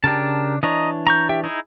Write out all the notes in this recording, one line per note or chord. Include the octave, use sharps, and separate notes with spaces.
C#3 D4 G4 A#4 A5
E3 D4 C#5 D#5 A#5
A#5 C#6 G6
G4 E5 G5
D#4 E4 G#4